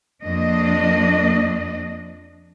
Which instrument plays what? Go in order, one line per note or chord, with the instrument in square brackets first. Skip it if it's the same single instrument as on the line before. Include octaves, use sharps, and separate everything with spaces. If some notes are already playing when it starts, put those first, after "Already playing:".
[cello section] F2 A#3 D4 D#5